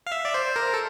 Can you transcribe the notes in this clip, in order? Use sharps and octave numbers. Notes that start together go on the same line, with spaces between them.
F5
E5
D5
C5
A#4
A4